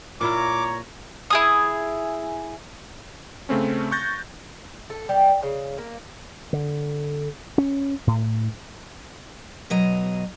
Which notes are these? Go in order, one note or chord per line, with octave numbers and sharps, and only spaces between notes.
A#2 E4 F4 C#5 A#5 D6
E4 G#4 D#6
C#3 A3 C4 C#4
C#6 F#6 G6 A6 A#6
A4
G3
C#3
A#3
D3
C#4
A2
B2 F#3 D#5 A#5